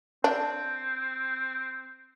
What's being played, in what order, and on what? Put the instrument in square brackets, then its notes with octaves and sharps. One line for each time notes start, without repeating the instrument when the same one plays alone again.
[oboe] C4 [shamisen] D4